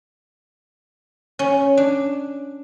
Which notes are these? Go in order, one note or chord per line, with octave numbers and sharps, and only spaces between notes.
C#4
D4